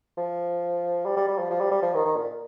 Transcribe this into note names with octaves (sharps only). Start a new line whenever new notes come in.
F3
G3
G3
G3
F3
F3
G3
G3
F3
D#3
D#3
A#2